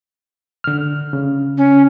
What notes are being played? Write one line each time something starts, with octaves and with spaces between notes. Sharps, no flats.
D3 F6
C#3
C#4